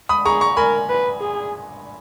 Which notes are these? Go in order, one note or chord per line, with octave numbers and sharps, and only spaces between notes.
B5 D#6
G#4 A#5 C#6
A#5 C#6
A#4 G#5 B5
B4
G#4